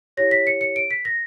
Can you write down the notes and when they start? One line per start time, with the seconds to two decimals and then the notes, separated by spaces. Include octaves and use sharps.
0.17 E4 G4 C#5 A#6
0.31 B6
0.47 C#7
0.61 C#7
0.76 D7
0.91 B6
1.05 A#6